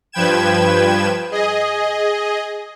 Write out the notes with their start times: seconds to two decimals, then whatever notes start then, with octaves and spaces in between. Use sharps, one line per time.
0.12 G2 F3 B4 G5 G#6 E7
1.31 G#4 D#5